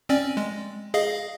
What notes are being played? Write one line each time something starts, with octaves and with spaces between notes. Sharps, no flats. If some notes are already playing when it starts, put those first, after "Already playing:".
C4 C#4 D5
G#3
G#4 D#5 F5